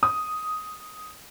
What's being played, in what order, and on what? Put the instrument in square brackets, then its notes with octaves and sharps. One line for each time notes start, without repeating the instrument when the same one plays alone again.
[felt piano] D#6